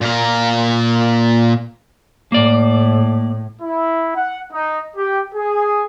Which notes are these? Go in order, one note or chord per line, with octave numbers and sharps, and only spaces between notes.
A#2 A#4
A2 A#3 D5
E4
F#5
D#4
G4
G#4